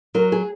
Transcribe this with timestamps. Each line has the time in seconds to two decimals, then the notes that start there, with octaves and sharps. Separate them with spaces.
0.14 F#3 A#4
0.32 G#4